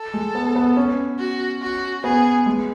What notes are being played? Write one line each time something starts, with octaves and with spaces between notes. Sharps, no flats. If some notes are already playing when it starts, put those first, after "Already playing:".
Already playing: A4
G#3
B3
B3
C#4
F#4
F#4
B3 G#4
G#3